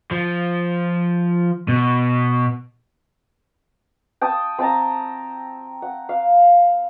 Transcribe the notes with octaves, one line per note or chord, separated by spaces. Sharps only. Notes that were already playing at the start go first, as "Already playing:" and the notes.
F3
B2
G5 A5 D#6
C4 G5 A5 A#5
F#5
F5